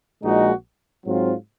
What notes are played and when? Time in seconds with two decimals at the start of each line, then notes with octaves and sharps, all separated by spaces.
0.23 A#1 A#2 G#3 D#4 F#4
1.05 G#2 F#3 C4 F4